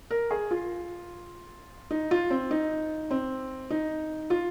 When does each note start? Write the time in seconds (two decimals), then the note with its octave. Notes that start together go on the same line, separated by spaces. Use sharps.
0.11 A#4
0.31 G#4
0.51 F4
1.91 D#4
2.11 F4
2.30 C4
2.51 D#4
3.11 C4
3.70 D#4
4.30 F4